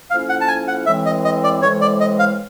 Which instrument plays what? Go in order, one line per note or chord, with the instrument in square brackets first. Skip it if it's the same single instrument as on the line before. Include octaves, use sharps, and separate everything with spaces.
[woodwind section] A2 F3 A#3 C#4 E4 [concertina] F5
[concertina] F#5
A5
G#5
F#5
[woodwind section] A2 E3 G#3 C4 [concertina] E5
[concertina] D#5
D#5
D5
[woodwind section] A2 E3 G#3 C4 [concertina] C#5
[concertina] D5
D#5
F5